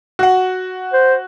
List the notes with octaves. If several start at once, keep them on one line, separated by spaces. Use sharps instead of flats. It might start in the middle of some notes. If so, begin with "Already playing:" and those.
F#4 F#5
C5